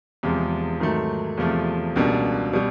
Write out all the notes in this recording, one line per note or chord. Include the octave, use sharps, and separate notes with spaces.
E2 C3 F3 G#3
G#2 D#3 F#3 A3
E2 C3 F3 A3
C#2 B2 G3 A#3 D4
B2 G3